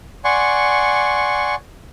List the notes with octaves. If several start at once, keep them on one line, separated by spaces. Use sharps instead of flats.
D5 F#5 G#5 C6 C#6